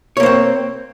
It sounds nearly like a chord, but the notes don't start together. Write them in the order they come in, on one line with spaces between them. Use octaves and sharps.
C#5 A#3 C5 C4